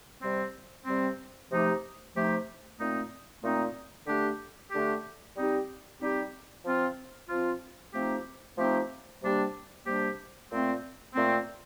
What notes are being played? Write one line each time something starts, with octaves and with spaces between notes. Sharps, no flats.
C3 G3 C4
C3 G3 C4
C3 F3 A3 D#4 G4
C3 F3 A3 D#4 G4
A#2 A3 C4 D#4
A#2 A3 C4 D#4
D3 A3 D4 G4
D3 A3 D4 G4
G3 C4 D#4 G4
G3 C4 D#4 G4
F3 C4 F4
F3 C4 F4
F3 A3 C4 D#4 G4
F3 A3 C4 D#4 G4
C3 G3 A#3 D4 G4
C3 G3 A#3 D4 G4
A#2 A3 C4
A#2 A3 C4